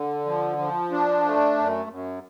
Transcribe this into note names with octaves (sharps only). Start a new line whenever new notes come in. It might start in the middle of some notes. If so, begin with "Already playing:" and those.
Already playing: D3
F3
F3
D4
A3
F#2
F#2